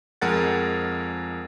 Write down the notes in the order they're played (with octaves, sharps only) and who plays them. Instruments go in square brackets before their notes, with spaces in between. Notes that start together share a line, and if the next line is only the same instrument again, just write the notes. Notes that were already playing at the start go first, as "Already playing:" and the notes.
[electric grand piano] F2 G#3 A#4 F#5 A6